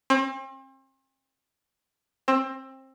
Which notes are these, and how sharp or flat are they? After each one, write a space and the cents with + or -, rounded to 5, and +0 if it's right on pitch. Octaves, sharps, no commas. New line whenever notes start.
C4 +40
C4 +25